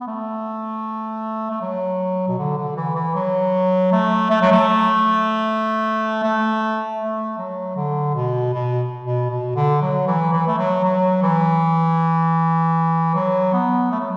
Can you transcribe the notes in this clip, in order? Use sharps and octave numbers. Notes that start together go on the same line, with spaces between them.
B3
A3
A3
F#3
B2
D3
D3
E3
E3
F#3
A3
A3
F#3
A3
A3
A3
F#3
D3
B2
B2
B2
B2
D3
F#3
E3
E3
A3
F#3
F#3
E3
F#3
B3
A3
F#3